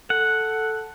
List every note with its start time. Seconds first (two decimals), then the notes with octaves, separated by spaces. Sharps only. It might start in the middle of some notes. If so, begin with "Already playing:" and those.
0.10 A4 F#5